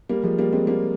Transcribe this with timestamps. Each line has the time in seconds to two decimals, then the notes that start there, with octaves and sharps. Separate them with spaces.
0.09 G3 A#3
0.24 F3 G#3
0.38 G3 A#3
0.53 G#3 C4
0.67 G3 A#3